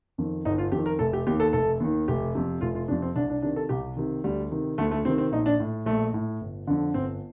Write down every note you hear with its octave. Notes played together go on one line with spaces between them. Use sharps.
F2 D#3
G1 D#4
F4
F2 D#3 G4
A#4
F1 A4
G4
D#2 D#3 G4
A4
F1 A4
D#2 D#3
F1 G4
F2 C3
F1 F4
F4
F2 C3 D4
C4
C2 D4
D4
C3 D#3 D4
A4
C2 G4
C3 D#3
D2 G3
C3 D#3
D2 A3
A3
C3 D#3 C4
C4
A#1 D#4
D4
A2
A#1 A3
A2
G1
F2 D3
G1 C4